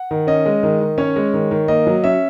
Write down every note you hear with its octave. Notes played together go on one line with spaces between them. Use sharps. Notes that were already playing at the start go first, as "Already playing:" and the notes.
Already playing: F#5
D#3
C#4 D#5
G#3
D#3
D#3
C#4 C#5
G#3
D#3
D#3
A#3 D#5
F#3
C#4 E5